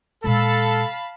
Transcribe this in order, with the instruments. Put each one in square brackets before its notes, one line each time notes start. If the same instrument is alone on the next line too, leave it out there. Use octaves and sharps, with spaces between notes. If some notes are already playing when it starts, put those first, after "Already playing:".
[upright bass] A#2 G#3 [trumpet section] A4 [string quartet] F5 A5 B5